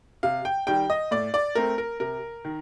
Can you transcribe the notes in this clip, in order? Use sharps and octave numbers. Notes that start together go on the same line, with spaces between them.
C3 F5
G5
D#3 G3 G5
D#5
A2 D5
D5
A3 C4 A#4
A#4
C3 A#4
D#3